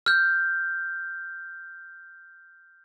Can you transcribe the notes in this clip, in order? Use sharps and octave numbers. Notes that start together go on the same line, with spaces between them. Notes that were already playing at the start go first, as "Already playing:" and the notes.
F6 G6